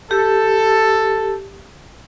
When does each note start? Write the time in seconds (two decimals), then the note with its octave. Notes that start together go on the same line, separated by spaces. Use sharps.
0.11 G4 A4